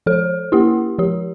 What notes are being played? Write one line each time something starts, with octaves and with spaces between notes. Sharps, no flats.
F3 A4
A#3 E4 G4
F3 G4